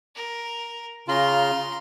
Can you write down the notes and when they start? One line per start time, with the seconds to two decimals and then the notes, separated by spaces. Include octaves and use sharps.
0.15 A#4
1.08 C#3 F4 A#5 C6